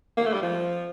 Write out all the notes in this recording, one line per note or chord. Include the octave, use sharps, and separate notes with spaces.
A#3
A3
G3
F3